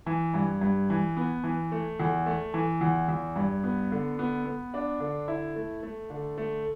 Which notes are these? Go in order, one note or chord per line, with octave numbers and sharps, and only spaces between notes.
E3
G2
G2
E3
B3
E3
A3
E2
A3
E3
E2
E2
G2
B3
D3
B3
B3
D4
D3
E4
A3
A3
D3
A3